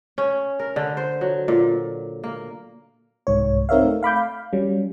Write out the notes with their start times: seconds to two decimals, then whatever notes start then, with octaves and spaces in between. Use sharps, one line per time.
0.18 C#4
0.59 A#4
0.76 D3
0.97 C5
1.21 F#3
1.48 A#2
2.24 A#3
3.27 C2 G#2 C#5
3.69 C4 D#4 A#4 C#5 E5 F5
3.84 A3
4.03 F5 B5 D6 G6
4.16 F5
4.53 F#3 G3 C#4